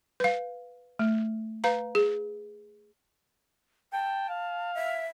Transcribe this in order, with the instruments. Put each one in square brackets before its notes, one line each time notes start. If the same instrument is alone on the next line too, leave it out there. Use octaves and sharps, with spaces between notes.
[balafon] B4 F5
A3
B4 F5 A#5
G#4
[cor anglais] G5 [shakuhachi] A5
[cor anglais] F5
[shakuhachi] E5